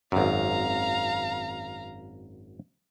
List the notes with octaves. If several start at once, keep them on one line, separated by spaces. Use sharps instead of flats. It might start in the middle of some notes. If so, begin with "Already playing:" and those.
G#1 F#2 F5 A#5